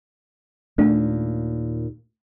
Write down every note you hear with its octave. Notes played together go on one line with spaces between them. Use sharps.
D#2 A#2 A3 D4